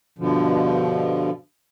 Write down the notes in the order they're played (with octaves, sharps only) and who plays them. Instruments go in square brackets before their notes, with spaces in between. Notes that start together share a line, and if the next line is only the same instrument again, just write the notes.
[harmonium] G2 B2 D3 F3